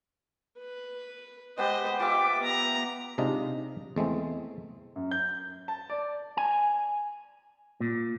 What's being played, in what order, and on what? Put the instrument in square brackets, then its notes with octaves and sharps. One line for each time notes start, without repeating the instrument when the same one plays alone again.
[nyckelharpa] B4
[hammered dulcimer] G#3 B3 G4 [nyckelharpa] C5 D#5
[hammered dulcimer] F4 G4 E5 [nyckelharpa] D6
[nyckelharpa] B3 A#5
[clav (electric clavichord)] C3 G#3 D4 D#4 F4
E2 G#3 A3 C4
[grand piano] F#2
G6
A5
D5
[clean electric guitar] G#5
A#2